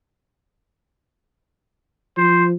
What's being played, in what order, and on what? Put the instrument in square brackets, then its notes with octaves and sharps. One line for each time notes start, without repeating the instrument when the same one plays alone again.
[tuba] F3 [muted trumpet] C5